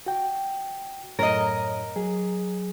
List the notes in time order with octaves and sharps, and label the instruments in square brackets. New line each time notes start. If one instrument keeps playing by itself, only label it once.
[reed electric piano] F#4 G5
[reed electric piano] F#2 A2 C#5 [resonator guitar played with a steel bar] A#4 D#5
[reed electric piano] F#3 G#4